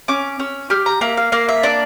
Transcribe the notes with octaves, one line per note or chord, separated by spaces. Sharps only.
C#4 D6
C#4 E6
G4 F6
A#5
A#3 E5
F5
A#3 F5
E5
D4 D5